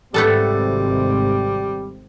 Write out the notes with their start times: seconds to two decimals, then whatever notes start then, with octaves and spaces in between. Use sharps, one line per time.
0.14 G#1 C3 G3 A3 B3 C4 A4